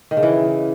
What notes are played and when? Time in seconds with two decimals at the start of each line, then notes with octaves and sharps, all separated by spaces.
0.11 D#3
0.17 C#3
0.23 E3